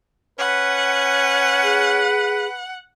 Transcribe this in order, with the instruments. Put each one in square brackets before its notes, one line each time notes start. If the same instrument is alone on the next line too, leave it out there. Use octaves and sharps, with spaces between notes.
[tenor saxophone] C#4 [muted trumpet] B4 [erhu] F#5
[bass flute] G#4